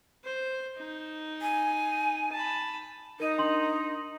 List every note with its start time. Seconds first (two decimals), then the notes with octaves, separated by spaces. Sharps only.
0.24 C5
0.78 D#4
1.42 G#5
2.32 A5 B5
3.20 D#4 A#4 D#7
3.38 D4 C6 F#7